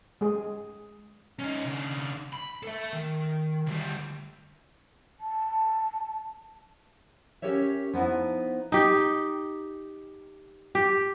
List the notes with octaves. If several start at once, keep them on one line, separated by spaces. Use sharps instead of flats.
G#3 G#4
C#4 D#4
C#3 D4
B5
A4 E5
D#3
D2 G3
A5
C#4 G4 A#4 C#5 E5
F3 B3 D#4 E4
D#4 G4
G4